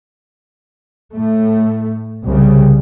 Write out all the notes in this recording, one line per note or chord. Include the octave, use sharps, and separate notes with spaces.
A2 A3
C2 C#3 G3